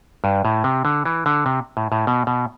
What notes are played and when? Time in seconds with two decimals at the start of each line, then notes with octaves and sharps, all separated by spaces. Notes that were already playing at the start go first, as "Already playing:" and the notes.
0.24 G2
0.45 A2
0.64 C3
0.85 D3
1.05 E3
1.26 D3
1.46 C3
1.77 A2
1.92 A2
2.07 B2
2.27 B2